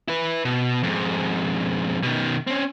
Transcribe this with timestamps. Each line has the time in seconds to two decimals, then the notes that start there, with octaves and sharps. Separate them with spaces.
0.08 E4 B4
0.45 B2
0.83 F2 G#2
2.03 B2 D#3
2.47 C4 C#4